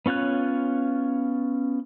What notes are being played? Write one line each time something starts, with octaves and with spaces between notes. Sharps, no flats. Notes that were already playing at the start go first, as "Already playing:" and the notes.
B3 C#4 F4 C#5 F#6